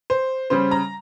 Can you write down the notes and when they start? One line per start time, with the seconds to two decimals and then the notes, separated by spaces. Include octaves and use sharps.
0.10 C5
0.50 C#3 G3 C5
0.71 A#5